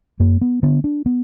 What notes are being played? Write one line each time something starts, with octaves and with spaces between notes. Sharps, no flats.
F#2 A#3
B3
D3 B3
D4
B3